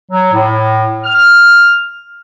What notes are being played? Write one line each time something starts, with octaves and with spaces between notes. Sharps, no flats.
F#3
A2
F6